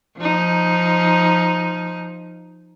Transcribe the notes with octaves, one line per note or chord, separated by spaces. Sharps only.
F3 D#4